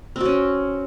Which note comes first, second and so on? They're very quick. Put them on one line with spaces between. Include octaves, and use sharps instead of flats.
C4 F#4 C#4